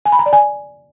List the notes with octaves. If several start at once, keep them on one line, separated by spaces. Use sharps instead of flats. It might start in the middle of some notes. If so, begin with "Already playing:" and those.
G#5
B5
A#5
D5
G#5